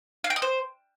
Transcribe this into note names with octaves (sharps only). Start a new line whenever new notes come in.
F5
G5
D#5
C5